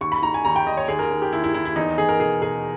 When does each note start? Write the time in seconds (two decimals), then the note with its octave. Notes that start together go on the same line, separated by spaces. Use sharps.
0.01 D#2 C#6
0.12 B5
0.22 D#3 A#5
0.34 G#5
0.45 D#2 A#5
0.56 G5
0.66 D#2 D#5
0.77 C#5
0.88 D#2 G#4
0.99 A#4
1.11 D#2
1.22 G4
1.32 D#2 E4
1.44 E4
1.54 D#2 E4
1.65 E4
1.76 E2 D#4
1.98 E2 G#4
2.09 A#4
2.20 B2 G#4
2.41 B2 G#4